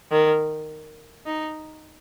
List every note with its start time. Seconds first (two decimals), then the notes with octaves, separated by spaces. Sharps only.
0.11 D#3
1.26 D#4